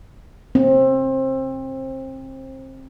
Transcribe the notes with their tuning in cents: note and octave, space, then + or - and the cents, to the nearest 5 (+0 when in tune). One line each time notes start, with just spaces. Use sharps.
C4 +25